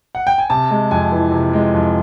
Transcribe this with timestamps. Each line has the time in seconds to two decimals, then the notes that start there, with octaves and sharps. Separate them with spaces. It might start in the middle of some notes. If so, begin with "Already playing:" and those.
0.15 F#5
0.27 G5
0.38 G#5
0.50 C3 A5
0.71 G#3
0.91 F2 G#5
1.12 E3
1.32 C3
1.53 G#3
1.74 F2